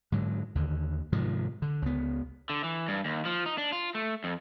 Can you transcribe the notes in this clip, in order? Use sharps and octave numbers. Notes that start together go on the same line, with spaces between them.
G#2 D3 F#3
D#2 D3
G#2 C3 D#3 F3
D3
C#2 B3
D3
E3
G2
D#2
F3
D#4
D4
F4
A3
F2